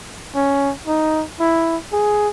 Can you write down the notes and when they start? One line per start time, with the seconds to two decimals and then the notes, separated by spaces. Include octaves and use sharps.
0.35 C#4
0.88 D#4
1.40 E4
1.92 G#4